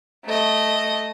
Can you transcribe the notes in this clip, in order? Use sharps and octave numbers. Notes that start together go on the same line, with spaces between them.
A3 D#5